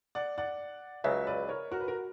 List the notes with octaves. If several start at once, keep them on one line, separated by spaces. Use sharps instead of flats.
D5 F#5
D5 F#5
C#2 C#3 F#3 C#5 E5
B4 D5
A#4 C#5
F#4 A#4
B4
F#4 A#4